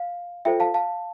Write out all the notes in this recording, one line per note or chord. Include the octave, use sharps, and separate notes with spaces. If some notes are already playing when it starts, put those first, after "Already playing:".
Already playing: F5
F4 A4 C5 E5 G5
F5 A5
F5 A5